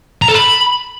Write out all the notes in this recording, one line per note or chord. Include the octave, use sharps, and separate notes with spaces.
A#5
A4
B5